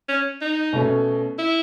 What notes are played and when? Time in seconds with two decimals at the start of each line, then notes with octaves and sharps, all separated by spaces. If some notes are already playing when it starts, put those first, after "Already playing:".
0.08 C#4
0.41 D#4
0.73 B2 A3 C#4
1.38 E4